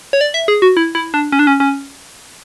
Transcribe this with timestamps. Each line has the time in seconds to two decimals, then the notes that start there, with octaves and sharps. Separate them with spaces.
0.13 C#5
0.21 D5
0.34 E5
0.48 G#4
0.62 F#4
0.77 E4
0.95 E4
1.14 D4
1.32 C#4
1.39 D4
1.47 C#4
1.60 C#4